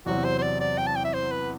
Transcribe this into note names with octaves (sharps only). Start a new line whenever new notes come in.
E2 C3 F#3 C4 F#4
C5
C5
D5
D5
G5
A5
G5
E5
C5
B4